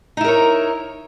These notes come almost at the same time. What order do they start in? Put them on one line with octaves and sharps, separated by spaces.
D#4 E4 A#4 C#5